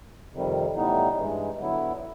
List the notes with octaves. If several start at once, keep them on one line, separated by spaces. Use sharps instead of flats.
F2 C3 D#3 G3
A2 E3 G3 B3 D#4
G2 E3 G#3
D3 F#3 B3 E4